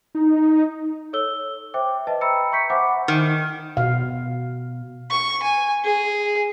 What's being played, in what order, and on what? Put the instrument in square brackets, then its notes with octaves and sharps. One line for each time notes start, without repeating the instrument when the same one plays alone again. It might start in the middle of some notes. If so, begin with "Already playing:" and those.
[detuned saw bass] D#4
[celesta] A4 C#5 E6 G7
C5 E5 G5 D6
B4 D#5 E5 A5
E5 G5 A#5 B5 E6 C#7
A#5 C#6 G6 B6 C#7
C5 E5 F#5 G#5 B5 D6
[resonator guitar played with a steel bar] D#3
[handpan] B2 F5
[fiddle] C#6
G#5
G#4